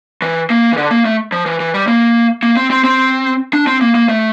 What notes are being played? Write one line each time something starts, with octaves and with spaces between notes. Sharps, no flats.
E3
A#3
E3
D3
A#3
A3
F3
E3
E3
G3
A#3
A#3
C4
C4
C4
D4
C4
A#3
A#3
A3